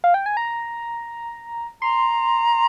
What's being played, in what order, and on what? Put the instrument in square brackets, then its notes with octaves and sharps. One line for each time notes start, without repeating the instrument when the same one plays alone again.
[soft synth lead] F5
G5
G#5
A#5
[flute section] A#5 [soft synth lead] C6